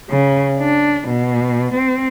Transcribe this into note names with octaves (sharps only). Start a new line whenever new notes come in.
C#3
D4
B2
C4